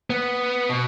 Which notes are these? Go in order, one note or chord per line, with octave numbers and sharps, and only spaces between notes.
B3
B2